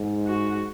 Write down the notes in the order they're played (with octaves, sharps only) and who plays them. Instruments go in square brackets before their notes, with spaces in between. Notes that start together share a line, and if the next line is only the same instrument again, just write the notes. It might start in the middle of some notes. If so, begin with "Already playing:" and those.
Already playing: [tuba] G#2
[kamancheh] F#4